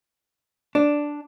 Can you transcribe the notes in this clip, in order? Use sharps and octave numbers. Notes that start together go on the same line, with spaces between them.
D4